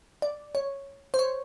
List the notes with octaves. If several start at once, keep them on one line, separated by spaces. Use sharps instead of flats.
D5
C#5
C5
C#5